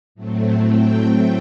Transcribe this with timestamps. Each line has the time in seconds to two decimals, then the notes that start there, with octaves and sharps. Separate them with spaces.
0.15 A2 F#3 A3 C4
0.66 G5